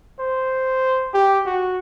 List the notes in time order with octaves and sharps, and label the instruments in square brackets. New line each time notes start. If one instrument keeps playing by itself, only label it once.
[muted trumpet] C5
G4
F#4